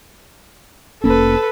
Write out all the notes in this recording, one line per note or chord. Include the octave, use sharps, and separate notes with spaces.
F1 A#3 C#4 A4 B4